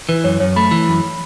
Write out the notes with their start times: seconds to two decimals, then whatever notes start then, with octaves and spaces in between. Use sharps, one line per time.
0.09 E3 B4
0.24 F#2 C#5
0.40 F#2 C#5
0.56 A3 B5
0.71 E3
0.88 F#2